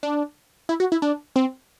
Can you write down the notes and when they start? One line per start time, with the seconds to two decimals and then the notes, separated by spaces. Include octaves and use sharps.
0.03 D4
0.69 E4
0.80 F#4
0.92 E4
1.02 D4
1.36 C4